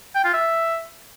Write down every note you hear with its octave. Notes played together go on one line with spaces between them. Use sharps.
G5
F4
E5